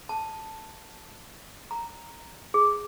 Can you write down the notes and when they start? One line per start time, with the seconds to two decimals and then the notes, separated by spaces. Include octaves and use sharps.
0.09 A5
1.71 A#5
2.54 G#4